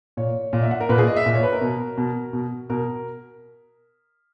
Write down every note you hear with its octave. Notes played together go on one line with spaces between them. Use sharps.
A#2 C#5
A#2
E5
F#5
A#4
A#2 B4
G#4
D#5
E5
A#2
C#5
B4
A#4
B2
B2
B2
B2 A#4